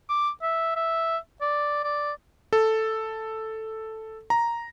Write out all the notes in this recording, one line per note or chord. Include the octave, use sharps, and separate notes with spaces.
D6
E5
E5
D5
D5
A4
A#5